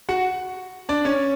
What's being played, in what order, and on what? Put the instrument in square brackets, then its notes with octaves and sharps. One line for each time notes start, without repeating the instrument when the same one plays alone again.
[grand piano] F#4 F#5
D4 D5
C#4 C#5